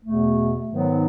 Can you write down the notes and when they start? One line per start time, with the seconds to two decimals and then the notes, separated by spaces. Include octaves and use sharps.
0.04 E2 B2 A3
0.67 G#2 D#3 F#3 B3 D#4